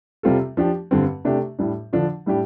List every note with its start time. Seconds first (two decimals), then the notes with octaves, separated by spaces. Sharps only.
0.23 C3 G3 C4 F4 A4
0.57 F3 D4 G4
0.91 G2 D3 G3 C4
1.25 C3 A3 D4 G4
1.59 A2 G3 D4
1.93 D3 F3 D4 F4
2.26 A2 G3 D4 G4